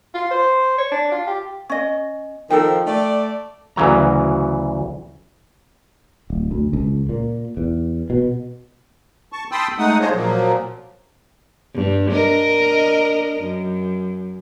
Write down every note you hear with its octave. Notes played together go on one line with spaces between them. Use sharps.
F4
C5
C#5
D4
F4
G4
C#4 D#5
D#3 F3 A4 G5
A3 D5
D2 C#3 E3 F#3 A#5
D1
D2
C#2
A#2
E2
B2
A5 C#6
G5 A5 B5 C6 D#6 E6
G#3 A3 D#4 F#5 D#6
D4 F4 G#4 C5 C#5 D#5
A#2 F3 F#3 A#3
G2
D4 A#4 D#5
F#2